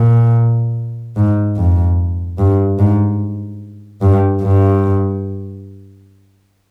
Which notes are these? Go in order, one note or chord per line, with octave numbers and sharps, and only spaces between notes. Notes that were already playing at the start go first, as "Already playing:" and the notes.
Already playing: A#2
G#2
F2
G2
G#2
G2
G2